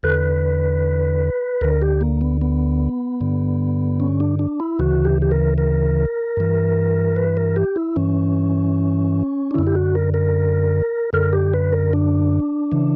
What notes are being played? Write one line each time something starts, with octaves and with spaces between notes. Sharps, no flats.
E2 D3 B4
D2 D3 A#4
G4
A#3
B3
B3
G2 D3
C#4
D4
D4
E4
D2 C#3 E3 F#4
G4
G4
A#4
A#4
G2 E3
B4
A#4
G4
E4
G2 E3 C#4
D4
F#2 D3 E4
G4
F#4
A#4
A#4
F#2 D3 A#4
G4
B4
A#4
D4
C#3 E3